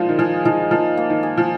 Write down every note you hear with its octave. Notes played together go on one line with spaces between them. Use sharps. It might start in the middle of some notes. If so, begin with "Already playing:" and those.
Already playing: A#2 F3 G#3 D#4 F4
D#3
F3 G#4
F3 D#4
F3 A#3
A#3
D#3
G#4
F3